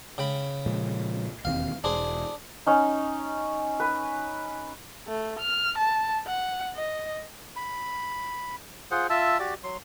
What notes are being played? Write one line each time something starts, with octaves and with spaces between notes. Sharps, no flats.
C#3 G5 B5
A#2 F3 G#3
E1 D#2 C4 F5
E1 D4 G#4 C5
C#4 D#4
B4
A3
F6
A5
F#5
D#5
B5
F4 G#4 C5 F#5
F4 E5 A5 E6
F#4 G4 D5
F#3 C6